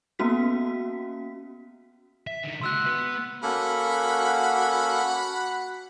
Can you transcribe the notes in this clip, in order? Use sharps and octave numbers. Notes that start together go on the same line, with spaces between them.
A#3 B3 C#4 F#4 B6
E5
D3 D#4
C#2 F#4 C6 E6 F#6
B3 B4
A#3 C#4 F#4 A4 F#5 B5